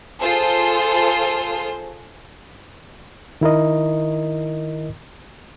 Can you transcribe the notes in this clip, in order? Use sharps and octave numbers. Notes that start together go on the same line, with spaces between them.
F4 G#4 A4 C5
D#3 E4 A#4 D#5